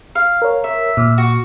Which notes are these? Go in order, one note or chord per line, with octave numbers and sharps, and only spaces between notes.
F5
A#4 C#5
E5
A#2
F#4